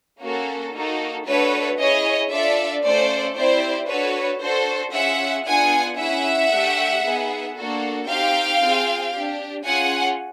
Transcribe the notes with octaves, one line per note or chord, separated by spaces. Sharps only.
A#3 C#4 F#4 A4
A#3 D#4 F#4 A4
A3 D4 F#4 A4 B4 C#5
C#4 E4 G#4 C#5 D#5
D4 F4 A4 D5 E5
A3 C#4 F4 A4 C5 D5
C4 E4 G4 C5 D5
D4 F#4 A4 B4 C#5
D4 F#4 A4 C5
C#4 F4 G#4 E5 F#5
B3 D4 F4 G#4 F#5 G#5
C#4 E4 G#4 E5 F#5
A3 D4 G4
B3 D#4 G#4
A#3 D4 F#4 A4
C4 D#4 G4 F5 G5
C4 F4 G#4
D4 G4
C#4 F4 G#4 F#5 G#5